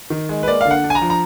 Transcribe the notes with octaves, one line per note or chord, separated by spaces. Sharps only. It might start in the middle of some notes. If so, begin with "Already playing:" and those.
D#3
G#3
B4
A#3 D5
D3 F5
F#5
D4
G#5
A#5
F3
A#5